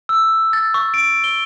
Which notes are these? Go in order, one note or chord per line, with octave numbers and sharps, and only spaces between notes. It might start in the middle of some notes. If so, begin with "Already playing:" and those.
E6
A6
C#6
D7
G7